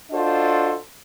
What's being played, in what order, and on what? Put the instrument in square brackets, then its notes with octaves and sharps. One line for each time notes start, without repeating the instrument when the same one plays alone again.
[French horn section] D4 F4 F#4 A4 C5 D#5